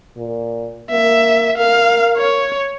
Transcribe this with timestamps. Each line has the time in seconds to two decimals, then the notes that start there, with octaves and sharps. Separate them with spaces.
0.17 A#2
0.91 A#3 E5
1.57 A#4 F5
2.18 C#5